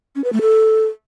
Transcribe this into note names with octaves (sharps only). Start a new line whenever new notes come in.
C#4
B4
A3
A4